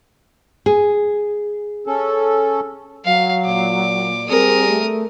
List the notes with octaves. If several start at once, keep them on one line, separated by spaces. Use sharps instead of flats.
G#4
C#4 A4
F#3 F5
A#2 D5 D6
G3 C4 G4 G#4 A#4 D#6
A3